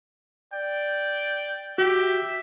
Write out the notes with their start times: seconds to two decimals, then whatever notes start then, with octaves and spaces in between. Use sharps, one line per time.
0.53 D5 G5
1.78 F#4 G4 E5